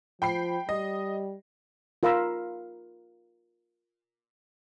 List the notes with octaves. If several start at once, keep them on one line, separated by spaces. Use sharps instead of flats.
F3 G5 B5 C7
G3 D#5
F4 A#4 F5 A#5 B5 E6